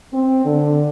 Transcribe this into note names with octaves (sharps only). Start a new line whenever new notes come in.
C4
D3